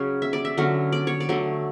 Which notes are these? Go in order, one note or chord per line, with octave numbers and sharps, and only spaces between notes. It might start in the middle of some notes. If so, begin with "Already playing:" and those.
Already playing: C#3 F#3 C#4
E5
D5
E5
D3 F#3 C#4
D5
C#5
D5
D3 F#3 A3